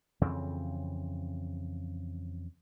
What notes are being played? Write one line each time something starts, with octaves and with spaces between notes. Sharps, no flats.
F2 C#3 E3 C4